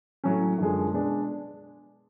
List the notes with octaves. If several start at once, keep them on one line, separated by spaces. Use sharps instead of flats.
A2 F#3 C#4
F#2 D3 F3 G#3
B2 G#3 D4